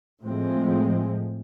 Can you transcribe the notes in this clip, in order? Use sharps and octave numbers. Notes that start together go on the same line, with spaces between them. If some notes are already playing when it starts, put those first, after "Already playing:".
A2 F3 G#3 C4